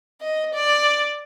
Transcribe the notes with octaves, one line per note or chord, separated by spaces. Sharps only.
D#5
D5